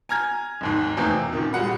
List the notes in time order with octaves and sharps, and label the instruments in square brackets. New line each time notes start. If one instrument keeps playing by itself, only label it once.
[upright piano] G#5 A#5 F6 G#6
F1 D#2 G#2
E2 B2 A3 A#3 C4 D#4
C3
C#2 A#2 D#3
A#2 G3 G#3 F#5 B5